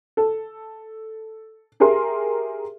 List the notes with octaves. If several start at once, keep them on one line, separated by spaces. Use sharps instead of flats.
A4
G4 G#4 A#4 E5 C6